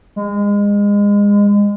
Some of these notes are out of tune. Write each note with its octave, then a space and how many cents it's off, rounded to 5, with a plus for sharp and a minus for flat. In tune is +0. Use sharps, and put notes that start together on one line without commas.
G#3 -30